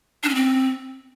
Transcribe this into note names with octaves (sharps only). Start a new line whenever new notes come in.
D4
C#4
C4